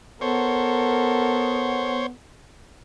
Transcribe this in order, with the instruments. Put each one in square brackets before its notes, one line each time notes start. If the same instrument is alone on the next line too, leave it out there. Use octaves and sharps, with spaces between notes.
[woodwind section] B3 [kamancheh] A4 A#4 [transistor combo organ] C5 C#5